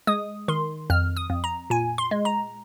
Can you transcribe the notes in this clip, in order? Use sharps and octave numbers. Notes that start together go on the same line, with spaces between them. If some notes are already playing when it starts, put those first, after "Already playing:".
G#3 D#6
D#3 C6
F2 F6
D#6
F2
A#5
A#2 G#5
C6
G#3
A#5